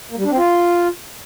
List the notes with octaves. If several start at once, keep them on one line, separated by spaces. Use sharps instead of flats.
A#3
G3
D4
C4
F4